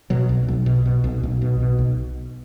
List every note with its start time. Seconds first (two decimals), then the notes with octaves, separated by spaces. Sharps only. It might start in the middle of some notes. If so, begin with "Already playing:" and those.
0.10 B2 F#3
0.29 B1
0.48 B1
0.66 B2
0.86 B2
1.04 B1
1.23 B1
1.41 B2
1.60 B2
1.79 B1